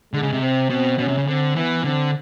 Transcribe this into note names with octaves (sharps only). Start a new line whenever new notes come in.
D3 G#3
C#3
C3
C4
B2 C4
B2 C#4
C3
C#3
D3 C4
E3 B3
D3 C4